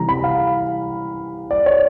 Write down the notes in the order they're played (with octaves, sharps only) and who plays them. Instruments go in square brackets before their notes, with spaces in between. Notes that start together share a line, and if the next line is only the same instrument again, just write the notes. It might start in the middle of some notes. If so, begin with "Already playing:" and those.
Already playing: [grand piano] C3 E3 G3 A#5
B5
F5
D5
C#5